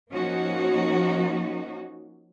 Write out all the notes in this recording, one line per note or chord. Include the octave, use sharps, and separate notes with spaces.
F3 A#3 C#4 D#4 F#4